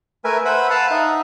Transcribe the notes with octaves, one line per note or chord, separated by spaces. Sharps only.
A3 A#4 B4 E5 G#5
B4 C5 E5 F#5 B5
F5 F#5 A5 B5
D#4 E5